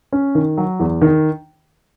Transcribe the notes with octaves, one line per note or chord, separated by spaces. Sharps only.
C#4
D#3
F#3
E2
D#3